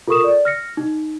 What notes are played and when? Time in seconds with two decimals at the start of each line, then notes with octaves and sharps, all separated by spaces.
0.08 F4 A4 A#4 C#6 D#6 E7
0.24 D5
0.45 F6 A#6 C#7
0.77 D#4